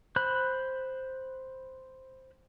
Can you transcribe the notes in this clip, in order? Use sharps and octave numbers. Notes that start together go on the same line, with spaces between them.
C5 B5 F#6